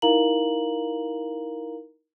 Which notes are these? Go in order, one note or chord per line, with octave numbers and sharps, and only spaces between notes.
D#4 E4 A#4 F5 A#5 F#7